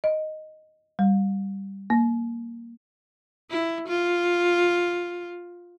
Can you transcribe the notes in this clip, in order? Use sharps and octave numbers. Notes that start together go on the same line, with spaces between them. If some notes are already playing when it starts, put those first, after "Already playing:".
D#5
G3
A#3
E4
F4